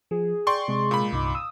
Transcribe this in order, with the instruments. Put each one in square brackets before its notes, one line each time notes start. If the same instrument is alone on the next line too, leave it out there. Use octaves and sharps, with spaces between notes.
[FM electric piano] F3 [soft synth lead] G#4
[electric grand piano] D5 C6 C#6 [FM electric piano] G5
[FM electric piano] C3 [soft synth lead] G#3
[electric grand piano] A#2 B5
[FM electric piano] C2 G2 D#4 [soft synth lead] D6
[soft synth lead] D#6 [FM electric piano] E6